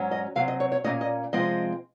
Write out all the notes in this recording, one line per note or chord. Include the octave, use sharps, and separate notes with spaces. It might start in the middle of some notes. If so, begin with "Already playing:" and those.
Already playing: G#2 F#3 C#4
D#5
C3 F#3 C4 F5
D#5
C#5
C#5
A#2 F#3 A#3 C#4 D#5
D#5
C3 F3 G#3 C4 D#5